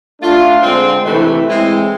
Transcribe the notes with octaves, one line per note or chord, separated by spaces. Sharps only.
A3 D4 F4
D3 G#3 C4
C3 E3 A3
A2 E3 G#3 C4